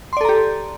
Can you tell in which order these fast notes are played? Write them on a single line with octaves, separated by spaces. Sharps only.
C6 D5 A4 A#5 G4